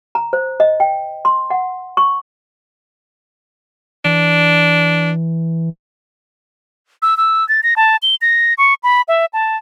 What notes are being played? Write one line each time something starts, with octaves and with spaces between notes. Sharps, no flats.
A#5
C5
D#5
G5
C6
F#5
C#6
E3 D4
E6
E6
A6
A#6
A5
G7
A#6
C#6
B5
E5
A5